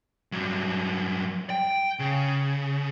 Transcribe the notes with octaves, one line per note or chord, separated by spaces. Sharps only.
G2 F#3
G5
C#3